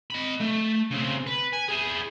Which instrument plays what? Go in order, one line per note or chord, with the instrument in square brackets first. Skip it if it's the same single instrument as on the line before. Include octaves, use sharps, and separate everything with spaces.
[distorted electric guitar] D#5 B5
A3
C#3 C4
B4
G#5
E4 G#4